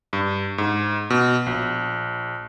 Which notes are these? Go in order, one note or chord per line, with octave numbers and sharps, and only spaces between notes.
G2
G#2
B2
A#1